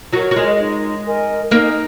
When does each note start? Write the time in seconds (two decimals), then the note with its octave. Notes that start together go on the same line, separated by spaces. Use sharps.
0.12 F#3 F#4 A#4 C#5
0.31 F#4
0.36 G#3 G#4
0.59 D#4
1.05 A#4 D#5 G#5
1.51 A#3 D#4 A#4